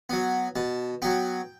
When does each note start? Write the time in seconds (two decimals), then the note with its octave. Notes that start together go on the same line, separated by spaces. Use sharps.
0.10 F#3 B3
0.56 B2 A5
1.02 F#3 B3 G5